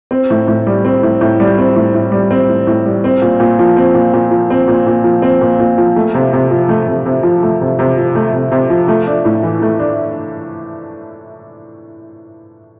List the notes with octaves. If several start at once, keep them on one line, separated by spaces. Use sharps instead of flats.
C4
A2
A2
G3
C4
A2
A2
G3
C4
A2
A2
G3
C4
A2
A2
G3
C4
A#2
A#2
F3
C4
A#2
A#2
F3
C4
A#2
A#2
F3
C4
A#2
A#2
F3
A3
C3
C3
F3
A3
C3
C3
F3
A3
C3
C3
F3
A3
C3
C3
F3
A3
D4
A2
E3
A3
D4